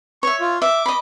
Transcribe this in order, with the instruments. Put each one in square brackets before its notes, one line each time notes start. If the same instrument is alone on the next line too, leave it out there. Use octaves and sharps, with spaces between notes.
[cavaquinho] C#5 E5 [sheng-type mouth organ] C#6
[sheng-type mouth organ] F4
[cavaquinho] E5 [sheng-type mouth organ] D6
[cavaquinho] D#5 B5